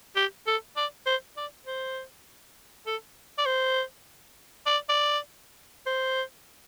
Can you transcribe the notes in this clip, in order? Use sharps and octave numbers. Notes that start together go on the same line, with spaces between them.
G4
A4
D5
C5
D5
C5
A4
D5
C5
D5
D5
C5